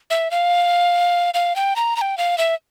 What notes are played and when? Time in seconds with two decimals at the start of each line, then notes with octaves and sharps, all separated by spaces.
0.10 E5
0.31 F5
1.34 F5
1.56 G5
1.76 A#5
1.97 A#5
2.01 G5
2.18 F5
2.38 E5